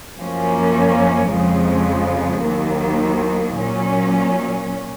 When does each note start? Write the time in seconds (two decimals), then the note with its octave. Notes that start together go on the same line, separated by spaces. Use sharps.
0.17 F#2 F3 A#3 C#4
1.31 F2 C#3 F3 G#3
2.45 D#2 D#3 F#3 A#3
3.58 A#2 F#3 C#4